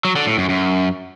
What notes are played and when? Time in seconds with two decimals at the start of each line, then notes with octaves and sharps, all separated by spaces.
0.05 F#3
0.16 D3
0.27 A2
0.38 F#2
0.49 F#2